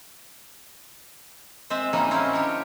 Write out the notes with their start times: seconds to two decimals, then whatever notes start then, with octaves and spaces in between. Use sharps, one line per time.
1.70 G#3 C4 C5 E5
1.93 A2 G3 G#3 A#3 C#4 D#4
2.11 C4 C#4 E4 A#4 C5
2.33 D3 G4 A#4 C#5